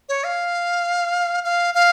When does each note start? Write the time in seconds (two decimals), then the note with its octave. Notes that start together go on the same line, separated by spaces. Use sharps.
0.09 C#5
0.24 F5
1.44 F5
1.74 F5